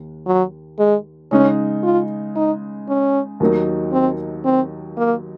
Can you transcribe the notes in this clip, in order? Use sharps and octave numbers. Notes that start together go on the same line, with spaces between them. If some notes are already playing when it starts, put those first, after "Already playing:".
Already playing: D#2
F#3
G#3
C#3 G#3 C#4 D#4
F4
D#4
C#4
D#2 D#3 F#3 A#3 D#4
C4
C4
A#3